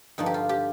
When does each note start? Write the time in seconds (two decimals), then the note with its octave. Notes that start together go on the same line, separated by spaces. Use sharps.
0.18 G2 D3 F3 D#4
0.26 G4
0.34 F4
0.49 G4